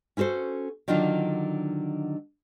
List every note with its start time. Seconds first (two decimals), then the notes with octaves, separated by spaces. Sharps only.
0.17 C#4 E4 F#4 A4 C5
0.88 D3 D#3 F#3 D4 F4